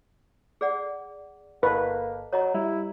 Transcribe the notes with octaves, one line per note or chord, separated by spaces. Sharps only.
G#4 D5 F#5
G1 A#3 A4 B4 D#5
F#3 C#5 D#5 A#5
G3 E4